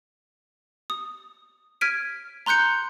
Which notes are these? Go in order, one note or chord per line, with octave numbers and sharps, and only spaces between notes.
D#6
F6 G#6 B6 D7 D#7
A#5 C6 F#6 G6 C#7